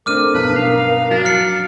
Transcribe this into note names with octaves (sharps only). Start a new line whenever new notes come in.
A3 C4 D4 A#4 D6 F6 D#7
B1 G2 B4
F5
F#3 D4 F5 A#6
F6 C7 C#7